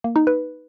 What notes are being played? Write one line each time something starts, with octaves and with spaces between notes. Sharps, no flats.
A#3
D#4
B4